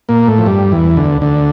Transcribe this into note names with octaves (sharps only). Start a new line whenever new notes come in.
A#2 A#3
A2 A3
F3
G2 G3
E2 E3
D2 D3
D2 D3